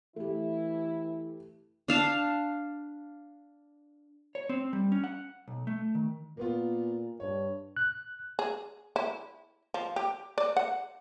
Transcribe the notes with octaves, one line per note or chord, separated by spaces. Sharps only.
E3 A3 E4 G4
D4 F5 A5
C#5
C4
G3
C#4
F#5
B1
A3
D#3
A#2 A#3 B3 F4
G2 C#5
F#6
G#4
E4
F3
G4
D5
F#5